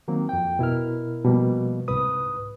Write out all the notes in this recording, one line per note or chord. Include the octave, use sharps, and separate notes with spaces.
D#3 F#3 A#3 C4
F2 G5
B2 E4 A#4 F6
B2 F3 G3 A#3
C2 G#2 B4 D#6